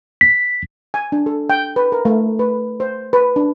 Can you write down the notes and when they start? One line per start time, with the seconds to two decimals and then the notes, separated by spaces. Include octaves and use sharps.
0.21 B6
0.94 G#5
1.12 D4
1.26 A4
1.50 G5
1.76 B4
1.92 A#4
2.05 A3
2.39 B4
2.80 C5
3.13 B4
3.36 D4